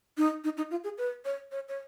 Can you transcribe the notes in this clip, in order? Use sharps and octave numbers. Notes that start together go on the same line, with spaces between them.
D#4
D#4
D#4
F4
G#4
B4
C#5
C#5
C#5